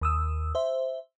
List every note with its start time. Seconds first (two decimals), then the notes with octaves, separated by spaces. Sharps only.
0.01 D#2 D#6 E6
0.55 C5 E5